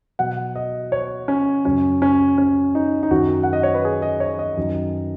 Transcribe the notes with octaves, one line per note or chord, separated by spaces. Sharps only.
B2 F#3 F#5
D#5
C#5
C#4
F#2 C#3 F#3 C#4
C#4
C#4
D#4
D#4
F#2 D#3 F#3 F#4
F#5
D#5
C#5
B4
G#4
D#5
C#5
D#5
F#2 D#3 F#3